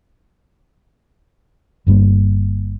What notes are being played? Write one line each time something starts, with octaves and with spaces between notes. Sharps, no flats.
G1 G2 G3 A#3